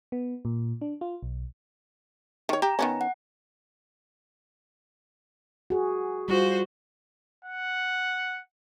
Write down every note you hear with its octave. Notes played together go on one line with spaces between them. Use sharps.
B3
A#2
D4
F4
B1
D#3 C#5
G4 A#5
D#3 B3 C#4
F#5
F#4 G#4
G3 F4 F#4 C5
F#5